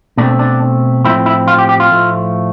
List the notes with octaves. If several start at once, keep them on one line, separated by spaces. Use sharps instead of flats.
B2 A3 C4 D4
D4
A2 F3 C4 E4
E4
F4
G4
G4
F4
A2 F3 A3